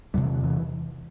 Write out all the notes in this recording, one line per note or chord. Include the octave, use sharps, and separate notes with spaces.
E2 C3 G3
E3
D3
E3